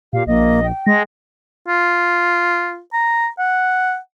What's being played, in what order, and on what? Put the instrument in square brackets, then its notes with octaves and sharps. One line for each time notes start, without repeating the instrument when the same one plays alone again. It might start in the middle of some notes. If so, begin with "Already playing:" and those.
[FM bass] A#2 [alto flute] G4 [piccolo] F5
[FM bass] A#1 [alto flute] A#3 [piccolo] D#5
[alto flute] G5
[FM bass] G#3 [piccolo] A#6
[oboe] F4
A#5
F#5